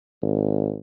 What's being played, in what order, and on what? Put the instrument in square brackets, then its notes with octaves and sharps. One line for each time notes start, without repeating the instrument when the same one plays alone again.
[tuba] G#1